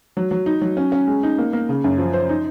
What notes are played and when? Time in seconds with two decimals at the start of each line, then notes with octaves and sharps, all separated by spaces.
0.17 F#3
0.31 F#3
0.46 D#4
0.61 F#3
0.77 C#4
0.92 C#4
1.07 G#3
1.23 D#4
1.39 A#3
1.53 A#3
1.69 C#3
1.84 F#2
1.98 F3
2.13 C5
2.29 D#4